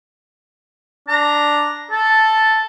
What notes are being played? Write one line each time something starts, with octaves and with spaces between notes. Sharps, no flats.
D4 A#5
A4 A5